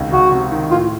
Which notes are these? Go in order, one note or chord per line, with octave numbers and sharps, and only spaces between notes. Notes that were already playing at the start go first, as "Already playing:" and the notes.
Already playing: C#2 C3 D#3
C#2 F#4
C3
D#3
A2 F4